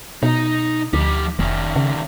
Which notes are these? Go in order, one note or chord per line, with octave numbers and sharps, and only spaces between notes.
B2 D#4 D#5
D2 F3 G4
F1 D#3 C#4
C#3